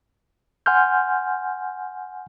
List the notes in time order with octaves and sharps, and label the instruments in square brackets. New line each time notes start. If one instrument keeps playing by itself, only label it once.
[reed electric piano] F#5 G#5 C6 F6 G6